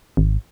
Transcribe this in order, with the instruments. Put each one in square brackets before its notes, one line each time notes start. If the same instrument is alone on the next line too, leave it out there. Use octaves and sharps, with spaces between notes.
[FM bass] G#1